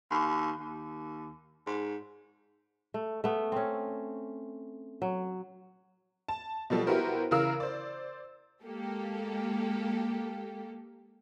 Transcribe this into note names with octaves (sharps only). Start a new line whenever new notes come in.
D#2
D#2
G#2
A3
A3 B3
C4 C#4
F#3
A5
B2 F3 G3 A4
B3 E4 F#4 G4 A#4 C5
C#3 E3 A#4 F5 E6
C5 D5
G#3 A#3 G4 A4